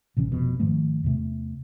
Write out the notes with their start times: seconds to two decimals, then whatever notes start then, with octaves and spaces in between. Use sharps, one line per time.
0.17 A1 C3 E3 C#4
0.32 F1 F2 B2
0.60 G#2 D#3 F3 A3
1.04 E2 C3 A3